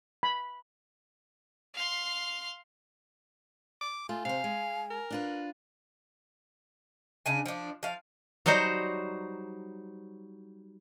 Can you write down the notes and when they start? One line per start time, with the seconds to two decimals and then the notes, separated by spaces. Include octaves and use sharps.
0.23 B5
1.74 F5 C6
3.81 D6
4.09 A3 F4 G#5
4.25 C3 C5 F5
4.44 G#3
4.91 A#4
5.10 D4 F4 B4
7.26 C#3 D4 G#5
7.46 F3 D4
7.83 F3 F5
8.46 F#3 G3 D#4 F#4 C5